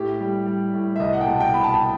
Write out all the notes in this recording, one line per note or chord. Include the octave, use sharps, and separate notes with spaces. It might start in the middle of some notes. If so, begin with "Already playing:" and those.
Already playing: A2 G4
G3
G3
A2
E5
C2 D#5
F#5
G5
B2 A5
G5
B2 B5
A5
G5